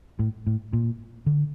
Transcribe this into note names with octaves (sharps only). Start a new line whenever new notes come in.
A2
A2
A#2
D3